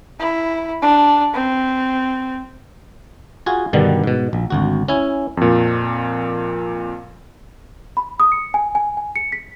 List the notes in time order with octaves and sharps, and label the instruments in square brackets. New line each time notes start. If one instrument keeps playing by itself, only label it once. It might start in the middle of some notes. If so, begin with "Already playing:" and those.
[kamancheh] E4
D4
C4
[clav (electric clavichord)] F4 F#4 G#4 G#5
G2 B2 D3 D#3 G3
G#2 B2
A#1
G#1 D2 F#4
C#4 E4 G#5
[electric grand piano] F2 A#2
[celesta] B5
D#6
C#7
G#5
G#5
G#5
C#7
B6